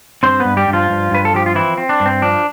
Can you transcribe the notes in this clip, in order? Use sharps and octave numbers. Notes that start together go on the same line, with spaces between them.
G2 C4 C5
G2 B3 B4
G3 G4
G2
F3 F4
G2
G2 B4
A4
F3 G4
F4
E3 C4 E4
C4
D4
G2
C4
F3 D4